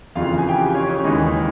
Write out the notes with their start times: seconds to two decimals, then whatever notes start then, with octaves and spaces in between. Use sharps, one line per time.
0.15 F2 C#3 E3 F4 F5
0.26 F4 F5
0.38 G#4 G#5
0.49 G4 G5
0.74 C#4 C#5
0.89 C#4 C#5
1.04 D#2 C#3 E3 G#3 D#4 D#5